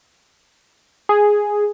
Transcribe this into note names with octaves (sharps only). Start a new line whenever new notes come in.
G#4